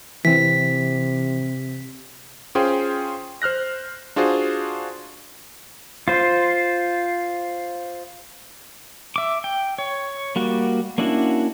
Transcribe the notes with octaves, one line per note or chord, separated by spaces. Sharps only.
C3 E3 C4 B6
C#4 F4 G#4 C5 G5 C6
C5 F6 F#6 A#6
D4 F4 F#4 G#4 C5
F4 C5
E5 D6
G5
C#5
G3 A#3 F#4
A#3 C#4 D4 E4 F#4